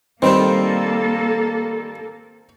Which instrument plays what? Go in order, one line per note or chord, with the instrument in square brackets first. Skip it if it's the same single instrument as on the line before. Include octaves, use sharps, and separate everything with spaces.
[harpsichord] D#3 G3 D4 [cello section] A#3 A4 [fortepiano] C4 C5